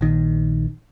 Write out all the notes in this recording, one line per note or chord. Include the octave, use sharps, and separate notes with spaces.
A#1 D#3